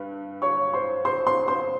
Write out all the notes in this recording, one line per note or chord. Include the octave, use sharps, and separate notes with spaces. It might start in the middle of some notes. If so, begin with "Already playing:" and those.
Already playing: G2 B4
C#5 C#6
C5 C6
C5 C6
C5 C6
C5 C6